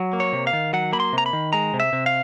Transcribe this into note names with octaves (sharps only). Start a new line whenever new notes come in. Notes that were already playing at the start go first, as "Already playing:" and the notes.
Already playing: F#3
A#3
C#5
C3
F5
D#3
F#3 F#5
A#3 B5
C6
C3 A#5
B5
D#3
G#3 A#5
C3
E5
C3
F5